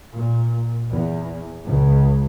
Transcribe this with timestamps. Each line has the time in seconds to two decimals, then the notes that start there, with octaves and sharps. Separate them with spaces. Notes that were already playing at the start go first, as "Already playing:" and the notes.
0.14 A#2
0.91 E2
1.65 C#2